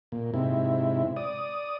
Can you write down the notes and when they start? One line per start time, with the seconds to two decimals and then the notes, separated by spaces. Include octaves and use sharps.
0.12 A#2
0.34 G#2 C3 E4
1.17 D5 D#6